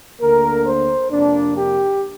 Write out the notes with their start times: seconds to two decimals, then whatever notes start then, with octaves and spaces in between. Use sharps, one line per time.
0.21 D2 D3 A#3 A#4
0.65 C5
1.10 F2 C3 A#3 D4
1.56 G4